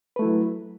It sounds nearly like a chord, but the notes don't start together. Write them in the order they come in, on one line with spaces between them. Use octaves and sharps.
B4 A3 E4 F#3